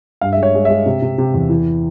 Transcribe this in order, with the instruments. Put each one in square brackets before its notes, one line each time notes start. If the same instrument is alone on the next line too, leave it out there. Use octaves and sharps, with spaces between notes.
[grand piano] G2 F5
G#3 E5
C#5
G#3
G#3 E5
C3
C3
C3
E2
E3